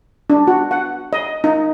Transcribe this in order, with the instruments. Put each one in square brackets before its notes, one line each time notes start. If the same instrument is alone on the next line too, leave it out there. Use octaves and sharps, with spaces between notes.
[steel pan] D4
F#4
F#5
D#5
D#4